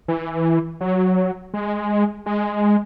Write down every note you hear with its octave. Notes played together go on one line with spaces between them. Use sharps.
E3
F#3
G#3
G#3